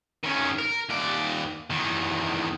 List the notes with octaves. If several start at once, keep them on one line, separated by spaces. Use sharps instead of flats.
D#3 C#4
A#4
D#2 D5
E2 D#3